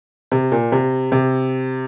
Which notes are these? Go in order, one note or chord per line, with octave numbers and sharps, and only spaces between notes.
C3
A#2
C3
C3